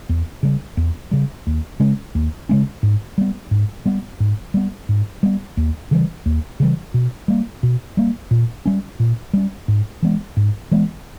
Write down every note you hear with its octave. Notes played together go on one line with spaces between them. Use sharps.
E2
C#3 G3
E2
C#3 G3
D#2
C#3 G#3 C#4
D#2
C#3 G#3 C#4
G#2
G3 B3
G#2
G3 B3
G#2
G3 B3
G#2
G3 B3
D#2
C#3 E3 G3
D#2
C#3 E3 G3
B2
G3 A#3
B2
G3 A#3
A#2
G3 C#4
A#2
G3 C#4
G#2
E3 G#3 B3
G#2
E3 G#3 B3